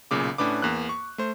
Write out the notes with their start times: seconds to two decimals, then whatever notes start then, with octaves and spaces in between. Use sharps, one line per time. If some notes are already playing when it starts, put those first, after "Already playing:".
0.11 B1 A#2 C#3 D6
0.38 A2 C#4 D4 B4 D6
0.62 E2 A#3 F#6
0.89 C#6
1.18 A3 C5